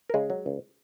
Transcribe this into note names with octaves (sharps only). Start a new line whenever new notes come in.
A#4
C#3 G#3 G#4
F#3
C#2